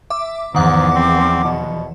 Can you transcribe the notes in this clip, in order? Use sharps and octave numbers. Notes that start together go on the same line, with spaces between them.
E5 D6
E2 G#2 D#3 F3 F#5 D6
C4
B2